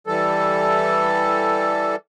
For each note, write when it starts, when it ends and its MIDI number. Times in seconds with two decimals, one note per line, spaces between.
0.07 1.96 52
0.07 1.96 55
0.07 1.96 69